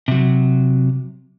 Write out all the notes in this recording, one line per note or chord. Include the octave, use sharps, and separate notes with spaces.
C3 F#3